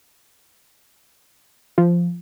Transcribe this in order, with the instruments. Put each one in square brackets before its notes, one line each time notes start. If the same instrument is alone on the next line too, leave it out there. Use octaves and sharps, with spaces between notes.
[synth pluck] F3